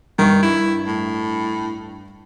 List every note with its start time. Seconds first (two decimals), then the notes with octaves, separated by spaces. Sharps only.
0.19 G2 D#3 C#6
0.43 E4
0.87 A2